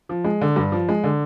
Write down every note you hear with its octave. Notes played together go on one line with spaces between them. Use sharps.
F3
G#3
D3
G2
F3
G#3
D3